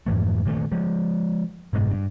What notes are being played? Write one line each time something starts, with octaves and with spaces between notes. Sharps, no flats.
F2 G#2 E3 A3
A#2 D#3 G3 A3
F3 G#3
F#1 G#2 B2 G#3
G2